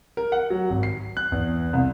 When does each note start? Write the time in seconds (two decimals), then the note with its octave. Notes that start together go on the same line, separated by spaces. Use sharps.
0.17 A#4
0.32 F#5
0.50 F#3
0.70 G#1
0.83 C7
1.17 F#6
1.32 E2
1.73 C2